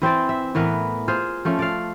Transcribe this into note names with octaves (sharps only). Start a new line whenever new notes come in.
E3 C4 C5 D5
E5
A2 E3 B3 A#4
F4 G#4 C5 F5
F3 A3 C#4
D5 F5